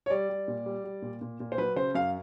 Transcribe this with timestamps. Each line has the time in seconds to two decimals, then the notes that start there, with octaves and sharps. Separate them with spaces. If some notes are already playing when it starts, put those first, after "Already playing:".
0.06 C#5
0.10 G3 D5
0.30 G3
0.48 A#2
0.66 G3
0.84 G3
1.02 A#2
1.21 A#2
1.40 A#2
1.52 C5
1.58 F#3 B4
1.76 C#3 C5
1.95 F#2 F5